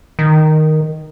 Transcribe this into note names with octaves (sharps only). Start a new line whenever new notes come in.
D#3